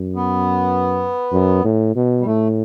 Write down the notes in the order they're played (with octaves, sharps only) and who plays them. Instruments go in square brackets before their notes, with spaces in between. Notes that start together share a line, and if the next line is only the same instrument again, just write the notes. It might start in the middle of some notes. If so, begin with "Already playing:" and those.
Already playing: [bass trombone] F#2
[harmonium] B3
[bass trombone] F#2
A2
B2
[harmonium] G3
[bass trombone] A2 [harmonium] A3